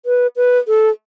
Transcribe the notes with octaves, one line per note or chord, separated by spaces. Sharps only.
B4
B4
A4